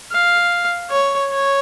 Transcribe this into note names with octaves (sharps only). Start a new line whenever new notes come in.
F5
C#5
C#5